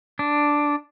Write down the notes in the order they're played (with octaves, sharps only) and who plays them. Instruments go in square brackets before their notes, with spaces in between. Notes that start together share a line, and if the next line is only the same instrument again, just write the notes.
[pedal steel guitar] D4